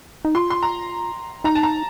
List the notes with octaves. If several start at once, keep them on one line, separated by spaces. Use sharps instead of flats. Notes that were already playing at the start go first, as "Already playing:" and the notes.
D#4
F4 C6
C6
A#5
D#4 A#5
A5
A#5